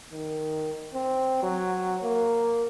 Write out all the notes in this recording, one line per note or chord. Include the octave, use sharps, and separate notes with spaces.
D#3
C4
F#3
A#3